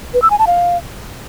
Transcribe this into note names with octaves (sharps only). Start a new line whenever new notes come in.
B4
E6
G#5
A5
F5